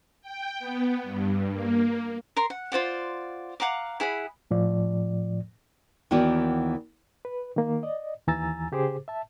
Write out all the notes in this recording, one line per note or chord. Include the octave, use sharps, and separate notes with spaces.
G5
B3
G2
A#3
A#4 A#5 C6
F#5
F4 C5 D5 F#5
F5 F#5 A#5 D6
E4 G#4 F#5 B5
A2 F3 D5
D#2 D#3 E3 B3 F#4 D5
B4
D#3 A#3
D5 D#5
D#2 E3 G#5 A#5 E6 A6
C#3 G4 G#4 C5 D6
E5 A5